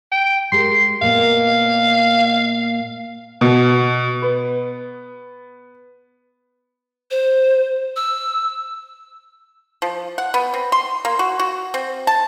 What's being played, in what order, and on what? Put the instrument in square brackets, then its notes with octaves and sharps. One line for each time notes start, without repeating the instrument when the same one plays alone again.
[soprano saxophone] G5
[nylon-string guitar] G#3 G4 A#4 [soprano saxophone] C6
[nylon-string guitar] A#2 A#3 B3 [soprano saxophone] F5
[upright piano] B2
B3
[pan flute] C5
E6
[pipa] F3
F#5
B3
C4
C6
A#3
F#4
F#4
C4
A5